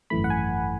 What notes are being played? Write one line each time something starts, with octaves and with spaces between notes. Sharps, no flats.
G#1 F#2 E3 A3 B5
F#5
G#5